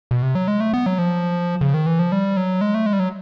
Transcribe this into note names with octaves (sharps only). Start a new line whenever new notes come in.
B2
C3
F#3
G#3
A3
B3
F#3
F3
C#3
D#3
E3
F3
G3
F#3
G#3
A3
G#3
G3
F#3